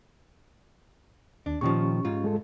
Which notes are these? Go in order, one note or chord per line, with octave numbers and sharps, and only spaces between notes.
D#2 D4
A#2 D#3 F3 C#4 G4 C#6
G#2 F4
G#3 A4